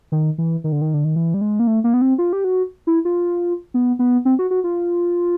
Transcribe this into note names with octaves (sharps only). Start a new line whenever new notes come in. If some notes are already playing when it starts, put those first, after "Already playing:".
D#3
E3
D#3
D3
D#3
D3
D#3
E3
G3
G#3
A#3
A3
A#3
B3
C4
F4
G4
F#4
E4
F4
B3
B3
C4
F#4
F#4
F4